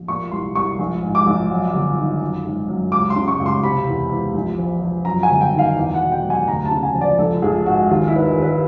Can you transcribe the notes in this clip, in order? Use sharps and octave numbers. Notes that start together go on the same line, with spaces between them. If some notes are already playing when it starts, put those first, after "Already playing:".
Already playing: A#1
A#2 C#6
C2 C6
C2 C#6
A#1
G#2
D6
A#1
F#3
G1
D#3
F#2
G#1
F#2
C#2 D6
C6
C#3
C#6
C#2
C6
C3 B5
E2
E2
A#1
F3
F3
F#2 A#5
G#5
G1
G5
D#3
F5
E2
F#5
B2
G5
F#3
G#5
D2 A#5
A5
C#3
G#5
F3
D5
A#1 A4
A#1 G#4
G#2 F#4
D#2 F4
E4
D#3 B4
A#4
D#2
B4